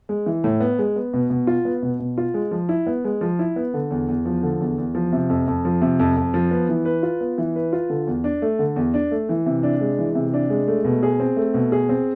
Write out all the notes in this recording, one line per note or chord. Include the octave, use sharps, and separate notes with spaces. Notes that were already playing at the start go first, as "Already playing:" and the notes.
G#3
E3
A2
B3
G#3
B3
B2
B2
F4
B3
B2
B2
F4
G#3
F3
E4
B3
G#3
F3
E4
B3
D3
E2
E2
F3
D3
E2
E2
F3
C3
F2
F2
F3
C3
F2
F2
F3
B3
E3
B4
F4
B3
E3
B4
F4
D3
E2
D4
A3
D3
E2
D4
A3
E3
C3
D4
G#3
E3
C3
D4
G#3
A3
B2
G#4
C4
A3
B2
G#4
C4